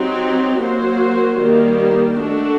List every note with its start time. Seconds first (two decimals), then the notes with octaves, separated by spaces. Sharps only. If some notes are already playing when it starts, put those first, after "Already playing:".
Already playing: F#3 C4 D#4 G4
0.61 F#3 A#3 F#4 C5
1.39 D#3 G3 A#3
2.16 A3 D4 F#4